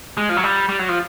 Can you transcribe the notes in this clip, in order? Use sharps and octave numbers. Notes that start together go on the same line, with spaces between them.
G#3
F3
F#3
G3
G3
F#3
F3